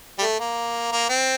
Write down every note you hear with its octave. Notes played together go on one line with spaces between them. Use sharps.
G3
A3
A#3
A#3
C4